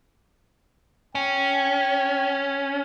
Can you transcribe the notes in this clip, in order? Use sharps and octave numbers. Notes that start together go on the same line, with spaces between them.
C#4 G5